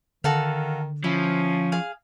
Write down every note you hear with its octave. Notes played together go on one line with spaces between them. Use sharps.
D3 D#3 F#4 A4 F5
F3 C#4 E4
G#4 F5